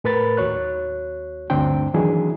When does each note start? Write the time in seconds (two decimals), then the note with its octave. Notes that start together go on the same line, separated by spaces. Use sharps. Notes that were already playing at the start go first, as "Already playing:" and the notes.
0.04 A2 A#4 B4 B5 A6
0.37 D#2 F#4 C#5 F#6
1.50 D2 G2 D3 C4 D4 G5
1.94 D#3 E3 F#3 D4 E4 G#4